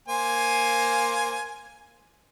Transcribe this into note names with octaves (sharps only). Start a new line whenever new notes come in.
A#3 C5 G#5